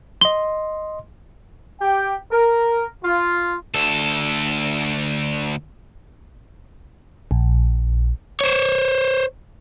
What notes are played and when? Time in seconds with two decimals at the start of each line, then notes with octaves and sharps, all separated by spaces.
0.21 D#5 C6 G7
1.82 G4 G5
2.32 A#4
3.04 F4
3.74 D2 A4
7.31 A#1
8.41 C5 C#5